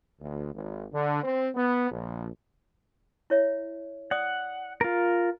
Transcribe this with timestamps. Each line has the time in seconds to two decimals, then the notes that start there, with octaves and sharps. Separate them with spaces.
0.20 D2
0.53 G#1
0.92 D3
1.23 C4
1.55 B3
1.90 A#1
3.30 E4 C#5 E5
4.11 D5 F#5 D#6
4.81 F4 A#4